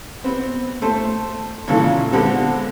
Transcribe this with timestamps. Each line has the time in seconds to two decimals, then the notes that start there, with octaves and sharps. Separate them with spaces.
0.24 B3 C4
0.82 A3 A4 C5
1.68 A#2 C#3 E3 G#3 A4
2.12 D3 G#3 B3 C4 A4